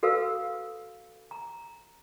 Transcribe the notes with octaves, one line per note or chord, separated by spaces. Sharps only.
F#4 A4 B4 F5 E6
A#5